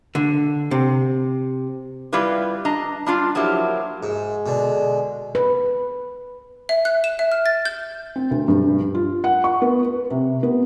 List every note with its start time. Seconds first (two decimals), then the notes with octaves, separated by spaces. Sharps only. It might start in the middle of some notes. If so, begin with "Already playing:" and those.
0.15 D3
0.71 C3
2.13 G3 E4 F4 G4 B4
2.65 D4 D#5 A#5
3.06 G3 D4 F4
3.35 F3 F#3 A#3 E4 G4
4.03 G#2 G#3
4.46 B2 D3
5.35 B4
6.69 E5
6.85 F#6
7.04 E7
7.19 E5
7.32 F6
7.46 A6
7.65 G6
8.16 C4
8.31 D2
8.48 G2
8.95 F4
9.24 F#5
9.44 C#6
9.62 B3
9.83 B4
10.11 C3
10.43 B3